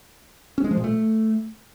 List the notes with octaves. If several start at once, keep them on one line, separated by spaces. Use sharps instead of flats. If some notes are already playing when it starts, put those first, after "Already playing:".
C#4
G#3
F3
A#2
A3